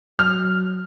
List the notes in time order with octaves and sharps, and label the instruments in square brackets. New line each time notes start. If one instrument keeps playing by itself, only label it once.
[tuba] F#3 [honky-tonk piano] F6